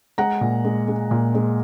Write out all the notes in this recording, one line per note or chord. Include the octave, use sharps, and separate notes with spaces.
G#3 F#5 A#5
A#2
G#3
G#3
A#2
G#3